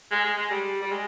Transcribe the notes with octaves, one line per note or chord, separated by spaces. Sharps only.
G#3
G#3
G#3
G3
G3
G#3